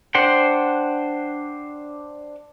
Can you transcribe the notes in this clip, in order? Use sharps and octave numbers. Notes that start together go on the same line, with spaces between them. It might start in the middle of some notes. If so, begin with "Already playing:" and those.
D4 C5 F#5 G5